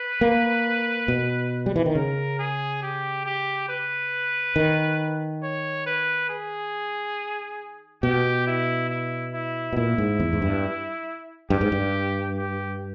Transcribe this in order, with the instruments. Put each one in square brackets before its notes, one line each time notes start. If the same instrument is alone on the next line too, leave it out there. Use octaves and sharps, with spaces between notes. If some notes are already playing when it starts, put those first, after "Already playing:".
Already playing: [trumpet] B4
[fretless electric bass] A#3
B2
G3
E3
D#3
[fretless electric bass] C#3 [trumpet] A#4
[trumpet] G#4
G4
G4
B4
[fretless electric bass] D#3
[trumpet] C#5
B4
G#4
[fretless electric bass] B2 [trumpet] G4
[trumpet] E4
E4
E4
[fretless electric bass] B2
[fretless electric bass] A#2 [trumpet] E4
[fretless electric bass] G#2
E2
G#2
G2
[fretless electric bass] G2 [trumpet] G4
[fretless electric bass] G#2
G2
[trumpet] G4